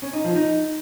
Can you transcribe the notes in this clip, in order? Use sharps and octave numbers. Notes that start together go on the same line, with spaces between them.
C#4
D#4
F3
D#4